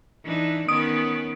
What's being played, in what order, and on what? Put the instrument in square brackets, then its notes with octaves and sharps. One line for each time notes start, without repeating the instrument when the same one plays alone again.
[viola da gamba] E3 D4 D#4
[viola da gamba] D#3 B3 C#4 [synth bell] D#6 D7